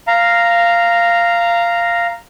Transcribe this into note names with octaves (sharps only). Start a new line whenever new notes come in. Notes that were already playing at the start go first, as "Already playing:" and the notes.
F5 A#5